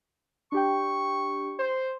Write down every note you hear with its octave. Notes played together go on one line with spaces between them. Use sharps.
D4 G4 G5 C#6
C5